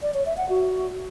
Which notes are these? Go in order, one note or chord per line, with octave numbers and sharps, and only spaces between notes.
D5
C#5
E5
F#5
F#4